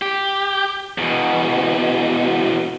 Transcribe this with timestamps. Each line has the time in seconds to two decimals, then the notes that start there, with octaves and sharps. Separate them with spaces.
0.02 G4
0.98 E2 B2